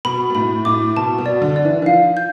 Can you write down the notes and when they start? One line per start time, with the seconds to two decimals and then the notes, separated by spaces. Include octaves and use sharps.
0.05 B2 B5
0.30 B2
0.35 A2 B5
0.65 A2 D6
0.97 B2 A5
1.18 B2
1.26 D5
1.42 D3
1.56 D5
1.65 E3
1.82 E3
1.86 F3 F5
2.17 G6